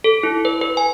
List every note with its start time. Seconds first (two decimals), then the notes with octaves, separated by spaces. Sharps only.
0.04 A4
0.23 E4
0.45 B4
0.61 B4
0.77 G#5